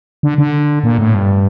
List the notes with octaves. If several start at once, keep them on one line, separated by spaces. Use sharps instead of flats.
D3
D3
A#2
A2
G2